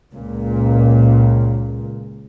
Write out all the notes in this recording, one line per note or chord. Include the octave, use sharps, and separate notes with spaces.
C#2 A#2